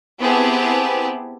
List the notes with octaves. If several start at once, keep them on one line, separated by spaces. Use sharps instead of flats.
B3 C4 E4 G4 G#4 A5